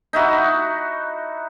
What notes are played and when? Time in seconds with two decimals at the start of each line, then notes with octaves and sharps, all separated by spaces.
0.13 D#4 E4 F#4